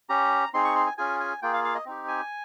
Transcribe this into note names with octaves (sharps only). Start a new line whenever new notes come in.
C#4 G4 A#5
C4 D#4 G#4 C6
C#6
C6
G#5
C#4 F4 G#4 G#5
G#5
A#3 F4 G#4 G5
F5
F5
D#5
C4 D#4 G4
G#5